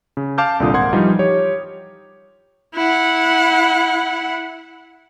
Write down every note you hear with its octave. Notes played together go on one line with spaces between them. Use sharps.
C#3
F5 A5 D6 F6 G6
C2 A#2 D3 F4 D#6
G#1 A#4 F#5 C6 G#6
E3 F3 G3 D#4 F4
G4 C#5
E4 F#5